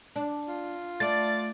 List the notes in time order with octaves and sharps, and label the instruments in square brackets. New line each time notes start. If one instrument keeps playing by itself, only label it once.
[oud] D4
[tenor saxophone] F4
[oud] A3 [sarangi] D5 [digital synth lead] A6